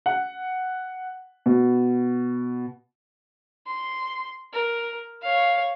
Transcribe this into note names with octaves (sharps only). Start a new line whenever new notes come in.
F#5
B2
C6
A#4
C#5 F5